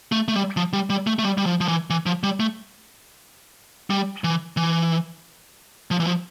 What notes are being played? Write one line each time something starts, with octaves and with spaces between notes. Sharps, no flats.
A3
A3
G3
F3
G3
G3
A3
A3
G3
G3
F3
F3
E3
E3
F3
G3
A3
G3
E3
E3
F3
E3
F3